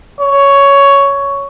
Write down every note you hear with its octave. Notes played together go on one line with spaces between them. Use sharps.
C#5